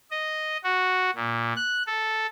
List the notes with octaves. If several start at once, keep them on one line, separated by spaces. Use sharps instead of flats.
D#5
F#4
A#2
F#6
A4